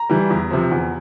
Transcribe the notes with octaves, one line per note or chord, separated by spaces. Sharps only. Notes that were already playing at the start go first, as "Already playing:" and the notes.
Already playing: A#5
E3 G3
E2
C3 F3
E2